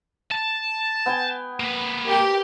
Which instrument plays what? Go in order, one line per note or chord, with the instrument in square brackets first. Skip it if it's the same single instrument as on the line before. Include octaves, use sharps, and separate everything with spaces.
[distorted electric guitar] A5
[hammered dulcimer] B3 G5 G#5
[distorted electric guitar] A#3 B4
[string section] G4 A#4